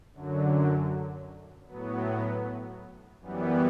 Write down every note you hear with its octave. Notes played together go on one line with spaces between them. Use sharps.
F#2 D3 F#3
A2 F#3 B3
F#2 E3 G3 B3